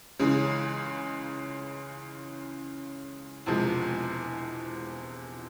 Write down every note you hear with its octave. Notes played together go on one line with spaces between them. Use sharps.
C#2 C#3 E3 G#3 C#4
E1 E2 C3 F3 G#3